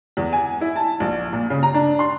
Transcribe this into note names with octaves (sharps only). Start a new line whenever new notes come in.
E2
G#5
E4
A5
A#1
A#2
C#3
A#5
D4
C6